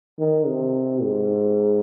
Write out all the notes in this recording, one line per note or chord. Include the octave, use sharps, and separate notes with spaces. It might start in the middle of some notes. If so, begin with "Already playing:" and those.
D#3
C3
G#2